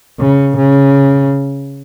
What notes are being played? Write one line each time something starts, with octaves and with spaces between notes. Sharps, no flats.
C#3
C#3